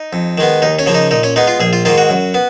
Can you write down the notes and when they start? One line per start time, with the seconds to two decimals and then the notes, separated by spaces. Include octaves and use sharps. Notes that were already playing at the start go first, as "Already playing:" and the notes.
Already playing: D#4
0.13 F2
0.38 D#3 G#3 B3
0.62 D#2 D#4
0.79 C#4
0.86 C#3 F3 A#3
0.95 D#4
1.11 A#2 D#4
1.23 C#4
1.36 G#3 B3 D#4
1.47 F4
1.60 A#1 G#4
1.73 F4
1.85 G#2 D#3 A#3 F4
1.98 F#4
2.09 F#2
2.34 B3